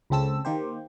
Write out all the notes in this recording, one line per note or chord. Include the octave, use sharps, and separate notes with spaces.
C#2 C#3 C4 A4 E6
D#3 A#3 G4 C5